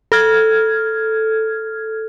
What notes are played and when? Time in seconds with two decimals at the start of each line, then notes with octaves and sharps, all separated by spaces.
0.12 A4 F6 G#6